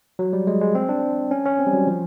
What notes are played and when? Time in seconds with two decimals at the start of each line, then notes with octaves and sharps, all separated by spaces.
0.19 F#3
0.33 G3
0.47 G#3
0.61 G#3
0.75 C4
0.89 D4
1.31 C#4
1.45 C#4
1.59 C4
1.67 G3
1.73 F#3
1.87 F3